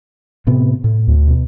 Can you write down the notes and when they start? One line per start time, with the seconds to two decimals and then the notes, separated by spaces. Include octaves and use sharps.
0.47 A2 C3 B3
0.84 A2
1.07 D2
1.27 B2